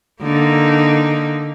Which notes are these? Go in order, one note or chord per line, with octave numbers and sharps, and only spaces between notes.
D3 A#3 D#4